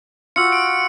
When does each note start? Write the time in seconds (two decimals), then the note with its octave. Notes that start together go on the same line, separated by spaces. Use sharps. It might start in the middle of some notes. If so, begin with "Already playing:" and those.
0.36 F4 F#4 E6 C#7
0.52 D7